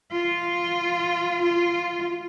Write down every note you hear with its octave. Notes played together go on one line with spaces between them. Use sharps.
F4
F4